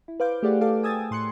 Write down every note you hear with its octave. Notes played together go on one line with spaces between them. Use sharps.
E4
B4 C5 F5 D6 G6
A3 G4 G#4 D5 F5 F#5
A4 F5 A5 D6
G5 G#5 D#6 E6 G#6 A6
A2 C6 F#6 C#7